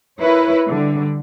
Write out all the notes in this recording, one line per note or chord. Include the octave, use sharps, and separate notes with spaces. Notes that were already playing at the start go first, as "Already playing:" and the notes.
E4 A#4 B4 C#5
D3 G3